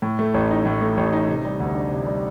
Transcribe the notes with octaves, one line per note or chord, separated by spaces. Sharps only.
A2
A3
A1
D#4
A2
A3
A1
D#4
C3
G3
D2
D4
C3
G3